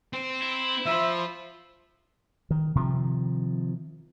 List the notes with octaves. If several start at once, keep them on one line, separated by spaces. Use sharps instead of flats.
C4
E4
F3 C5 E5 B5
D#3
C3 D#3 F3